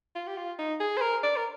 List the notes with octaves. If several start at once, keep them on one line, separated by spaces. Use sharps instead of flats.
F4
G4
F4
D#4
G#4
C5
A#4
D5
A#4